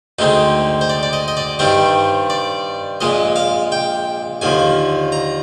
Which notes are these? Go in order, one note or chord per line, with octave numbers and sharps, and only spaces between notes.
D2 D3 G#3 C4 D#4
C5
D5
D5
D#5
D#5
D5
G2 D#3 G3 C4 C5
D5
A#1 A#2 G#3 D#5
F5
G5
D#2 D3 F3 G#5
A#5